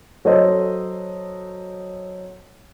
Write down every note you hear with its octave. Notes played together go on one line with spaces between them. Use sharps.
F#3 A4 C5 D#5